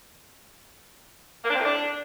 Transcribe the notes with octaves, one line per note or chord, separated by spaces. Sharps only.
A#3
D4
C4
A2
D4